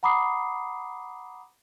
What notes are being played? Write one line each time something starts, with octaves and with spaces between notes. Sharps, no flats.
F#5 A#5 B5 D6 D#6 C7